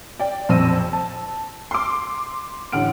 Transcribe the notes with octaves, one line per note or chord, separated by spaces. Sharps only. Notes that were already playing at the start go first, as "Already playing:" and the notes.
D5 G5
A#1 F2 C4 E6 A#6 D#7
A5
C6 D6
A1 D3 F#5 F6 D7